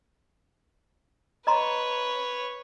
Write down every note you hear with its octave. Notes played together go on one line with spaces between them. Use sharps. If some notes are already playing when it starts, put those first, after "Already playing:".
B4 C#5 D#5 A#5 C6